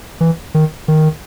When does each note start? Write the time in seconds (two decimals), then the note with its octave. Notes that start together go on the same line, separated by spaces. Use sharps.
0.21 E3
0.54 D#3
0.88 D#3